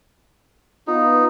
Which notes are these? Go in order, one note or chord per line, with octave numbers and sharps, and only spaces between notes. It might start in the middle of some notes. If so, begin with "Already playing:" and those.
B3 D#4 F4